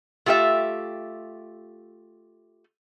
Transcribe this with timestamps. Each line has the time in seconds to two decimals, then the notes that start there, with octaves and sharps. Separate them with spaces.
0.26 A3 F4 G4 A#4 E5